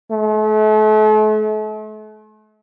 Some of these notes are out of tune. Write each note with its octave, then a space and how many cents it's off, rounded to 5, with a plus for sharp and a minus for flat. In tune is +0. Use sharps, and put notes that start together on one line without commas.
A3 -40